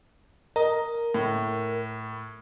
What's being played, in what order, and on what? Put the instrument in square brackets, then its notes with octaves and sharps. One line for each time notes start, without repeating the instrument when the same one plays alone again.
[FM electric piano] A#4 [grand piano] D#5
[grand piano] A2